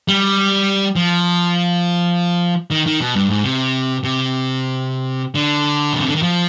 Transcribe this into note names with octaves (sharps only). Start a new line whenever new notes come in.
G3
F3
D#3
D#3
B2
G2
G#2
C3
C3
D3
B2
C3
D3
D#3
F3